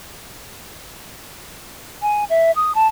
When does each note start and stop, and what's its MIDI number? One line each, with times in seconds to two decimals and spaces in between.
2.02 2.24 80
2.30 2.51 76
2.56 2.75 87
2.75 2.88 81